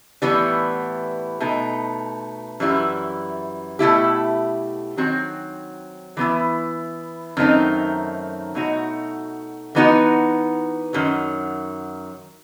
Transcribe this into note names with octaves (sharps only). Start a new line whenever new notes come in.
A2 E3 G3 B3
B2 A3 D#4
F#2 E3 G3 E4
B2 A3 E4 G4
D#3 F#3 C4 F#4
E3 B3 E4
F#2 D#3 A3 C4 D#4
B2 A3 D#4 F#4
E3 B3 D#4 F#4
F#2 D#3 F#3